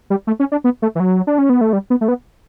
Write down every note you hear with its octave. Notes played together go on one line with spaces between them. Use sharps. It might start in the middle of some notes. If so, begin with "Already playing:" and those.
G3
A3
C#4
D4
B3
A3
E3
F#3
D4
C#4
B3
A3
G3
B3
A3
B3